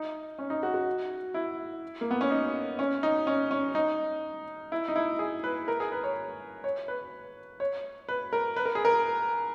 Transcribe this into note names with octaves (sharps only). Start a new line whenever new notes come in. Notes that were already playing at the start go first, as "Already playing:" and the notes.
Already playing: D#4
C#4
D#4
F#4
F#4
E4
A#3
B3
C#4
D#4
C#4
D#4
C#4
C#4
D#4
E4
D#4
E4
G#4
B4
A#4
G#4
B4
C#5
C#5
B4
C#5
B4
A#4
B4
A#4
G#4
A#4